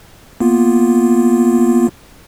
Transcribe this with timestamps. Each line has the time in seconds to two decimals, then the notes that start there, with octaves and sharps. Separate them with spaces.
0.40 A#3 B3 F4